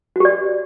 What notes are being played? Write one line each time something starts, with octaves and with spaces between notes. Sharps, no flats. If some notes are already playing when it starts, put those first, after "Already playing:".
F#4 G4 D5